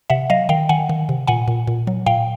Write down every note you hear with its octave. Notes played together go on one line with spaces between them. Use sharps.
C3 E5 F#5
F#3 D#5 F5
D#3 F5 G5
D#3 F#5 G#5
D#3
C3
A#2 F#5 G#5
A#2
A#2
F#3
A#2 F5 G5